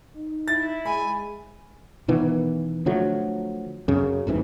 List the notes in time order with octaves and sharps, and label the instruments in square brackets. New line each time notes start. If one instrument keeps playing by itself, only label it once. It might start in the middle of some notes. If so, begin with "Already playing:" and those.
[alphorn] D#4
[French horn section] E4 [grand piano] A6
[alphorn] G#3 [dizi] G#5 [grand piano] B5
[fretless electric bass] B2 D#3 E3 B3
D3 F3 F#3 A3
F#2 C#3
A1 F2 G#2 E3